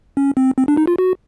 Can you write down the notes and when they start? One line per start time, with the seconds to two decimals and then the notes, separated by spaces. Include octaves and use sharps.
0.17 C#4
0.37 C4
0.57 C4
0.68 D4
0.77 D#4
0.87 F4
0.98 F#4